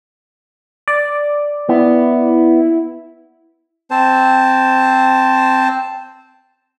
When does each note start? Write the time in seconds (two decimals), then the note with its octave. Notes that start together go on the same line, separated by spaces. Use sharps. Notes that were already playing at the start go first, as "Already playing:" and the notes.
0.88 D5
1.69 B3 E4
3.91 C4 C5 A5